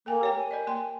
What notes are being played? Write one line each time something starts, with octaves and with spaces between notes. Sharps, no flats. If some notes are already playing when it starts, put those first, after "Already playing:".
A#3 A4 G5 G#5
G4 C#5 G5
G#5
A#4 D5 D#5
A#3 G5 C6